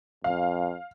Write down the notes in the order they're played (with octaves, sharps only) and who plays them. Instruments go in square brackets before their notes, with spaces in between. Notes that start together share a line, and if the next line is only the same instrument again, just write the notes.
[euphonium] F2 [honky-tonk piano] F5